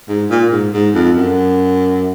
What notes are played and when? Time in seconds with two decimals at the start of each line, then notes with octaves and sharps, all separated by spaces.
0.09 G#2
0.30 A#2
0.52 G#2
0.73 G#2
0.94 F2
1.17 F#2